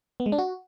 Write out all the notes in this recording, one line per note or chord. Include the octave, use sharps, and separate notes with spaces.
B3
G#3
D4
F#4